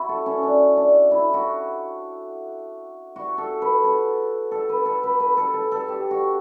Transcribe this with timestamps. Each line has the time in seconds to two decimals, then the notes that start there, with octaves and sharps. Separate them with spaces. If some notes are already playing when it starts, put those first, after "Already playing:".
Already playing: E4 F#4
0.09 A4
0.26 C#4
0.43 D4
0.77 D4
1.11 E4
1.34 F#4
3.16 F#4
3.38 A4
3.62 B4
3.84 A4
4.51 A4
4.69 B4
4.85 A4
5.03 B4
5.20 B4
5.37 A4
5.54 A4
5.72 A4
5.88 G4
6.11 F#4